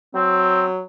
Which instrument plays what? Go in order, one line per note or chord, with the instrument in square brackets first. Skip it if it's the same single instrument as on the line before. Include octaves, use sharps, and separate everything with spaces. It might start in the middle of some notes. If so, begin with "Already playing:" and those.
[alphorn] F#3 [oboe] C4